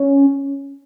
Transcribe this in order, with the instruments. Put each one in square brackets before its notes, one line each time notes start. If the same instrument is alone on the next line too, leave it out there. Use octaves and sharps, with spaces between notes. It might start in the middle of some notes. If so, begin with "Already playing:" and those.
Already playing: [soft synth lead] C#4